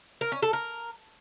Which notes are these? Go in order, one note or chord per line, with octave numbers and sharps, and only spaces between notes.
A#4
C#4
A4
A#4